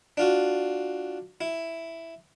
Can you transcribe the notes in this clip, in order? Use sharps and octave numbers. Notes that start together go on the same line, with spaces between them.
D4 F4 F#4
E4